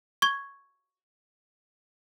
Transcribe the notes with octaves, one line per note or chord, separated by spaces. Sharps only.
C#6 G#6 G7